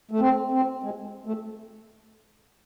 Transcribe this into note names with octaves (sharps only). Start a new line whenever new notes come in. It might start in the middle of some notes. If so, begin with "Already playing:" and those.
A3
C4
C4
G#3
A3